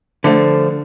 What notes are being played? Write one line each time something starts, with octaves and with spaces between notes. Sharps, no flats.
D3 F3 A3